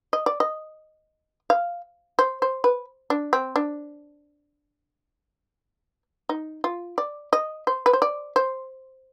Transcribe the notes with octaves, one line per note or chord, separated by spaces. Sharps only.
D#5
D5
D#5
F5
C5
C5
B4
D4
C4
D4
D#4
F4
D5
D#5
C5
B4
C5
D5
C5